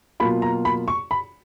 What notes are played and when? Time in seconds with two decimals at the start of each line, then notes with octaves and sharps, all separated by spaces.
0.20 B2 F#3 A#3 F4 B5
0.42 A#5
0.65 B5
0.88 C#6
1.11 B5